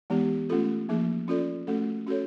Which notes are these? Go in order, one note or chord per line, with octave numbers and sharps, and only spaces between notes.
E3 G#3 B3 D#4 G4
A3 C#4 F4 A4
F3 A#3 D#4 G#4
C#4 F4 A4 D5
A3 C#4 F#4 A4
C#4 F#4 A4 C#5